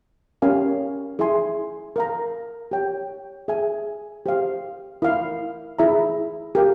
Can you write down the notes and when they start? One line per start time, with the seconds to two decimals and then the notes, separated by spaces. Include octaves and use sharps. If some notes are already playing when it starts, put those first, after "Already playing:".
0.42 C#4 G4 A#4 F5 G#5
1.19 E4 G#4 E5 G#5 C6
1.96 A#4 F5 A#5
2.71 G4 C#5 G5
3.48 G#4 E5 G#5
4.26 G4 C5 F5
5.02 E4 A#4 F5
5.79 E4 G#4 E5 A#5
6.55 G4 A#4 F5